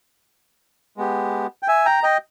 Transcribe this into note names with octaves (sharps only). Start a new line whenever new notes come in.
G#3 B3 G4
G5
E5 G#5
G5 A#5
D#5 G5